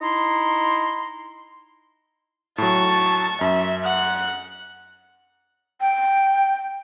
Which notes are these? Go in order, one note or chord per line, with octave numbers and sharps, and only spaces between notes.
D#4 E4 A#5 C6
A2 F#3 A5 C#6
F#2 E5
F#5 F#6
G5